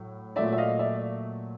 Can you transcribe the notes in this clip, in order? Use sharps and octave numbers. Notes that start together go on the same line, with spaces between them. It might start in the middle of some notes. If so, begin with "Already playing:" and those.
Already playing: A2 F#3
A#2 F#3 A3 D5 E5
E5
D#5 F5
D5 E5